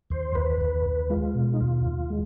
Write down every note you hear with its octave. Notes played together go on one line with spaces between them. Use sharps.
D#2 C5
D#2 B4
D#2
D#2
G#3 F4
B2
D#4
D#2 F4
D#2
G#3